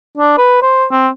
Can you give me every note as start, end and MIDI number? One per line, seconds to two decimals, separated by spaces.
0.17 0.37 62
0.38 0.61 71
0.62 0.85 72
0.91 1.08 60